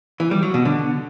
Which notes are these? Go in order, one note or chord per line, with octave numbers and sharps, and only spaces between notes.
E3
G3
F#3
B2
D3